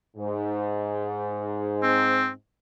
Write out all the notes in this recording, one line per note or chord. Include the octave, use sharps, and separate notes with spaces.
G#2
C4